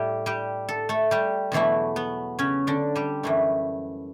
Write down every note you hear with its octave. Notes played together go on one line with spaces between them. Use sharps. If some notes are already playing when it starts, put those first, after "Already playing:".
Already playing: A2 G3 G4
G3 G4
A4
A3 A4
G3 G4
E2 B2 E3 F#3 A3 E4
B3
C#3 C#4
D3 D4
G3 G4
F#2 E3 A3